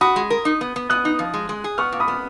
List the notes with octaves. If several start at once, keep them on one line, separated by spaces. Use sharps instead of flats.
F#4 B5 D#6
G#3
A#4
D#4
B3
B3
B3 D#6 F#6
D#4
F3
G#3
G#3
G#4
B3 C#6 F6
A#2
B5 D#6
B3